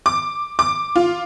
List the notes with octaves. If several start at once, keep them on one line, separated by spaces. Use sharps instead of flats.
D6
D6
F4